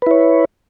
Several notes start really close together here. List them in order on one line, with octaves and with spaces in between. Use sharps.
B4 E4 C#5